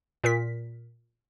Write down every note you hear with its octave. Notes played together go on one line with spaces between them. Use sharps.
A#2 A#4 B6